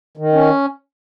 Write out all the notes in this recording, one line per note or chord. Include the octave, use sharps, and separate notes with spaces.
D#3
C#4